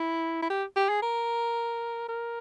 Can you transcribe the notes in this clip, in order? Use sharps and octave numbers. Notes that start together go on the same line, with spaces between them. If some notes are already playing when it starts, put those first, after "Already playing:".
Already playing: E4
E4
G4
G4
G#4
A#4
A#4